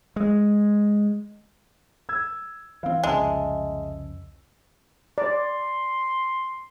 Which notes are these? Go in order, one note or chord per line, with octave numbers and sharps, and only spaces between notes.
G#3
E6 G#6
E3 C4 F5
C2 F2 C#3 G#3 D#5 E5 A5
D5 C6